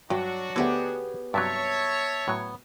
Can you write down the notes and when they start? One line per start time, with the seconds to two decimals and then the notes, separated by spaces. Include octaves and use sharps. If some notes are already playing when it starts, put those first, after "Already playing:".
0.10 G2 F#3 D4 F#4
0.56 D2 D3 B3 G4 G#4
1.34 G2 C3 F#3 C#5 E5 A5
2.28 A2 F#3 B3